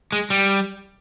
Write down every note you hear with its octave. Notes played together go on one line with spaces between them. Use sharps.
G#3
G3